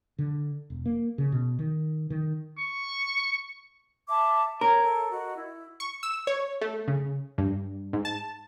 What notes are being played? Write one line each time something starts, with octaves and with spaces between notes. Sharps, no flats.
D3
E1
A#3
C#3
B2
D#3
D#3
C#6
E5 A5 D6
A#4 C#5
A4
F#4 D#5
E4
C#6
E6
C#5
A3
C#3
G2
G#2
A5